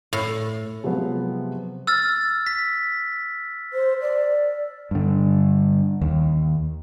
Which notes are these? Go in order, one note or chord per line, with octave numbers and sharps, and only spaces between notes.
A2
C3 F3 F#3 G#3 B3
E6 F6 A6
B6
C5
D5
G2 D3
D#2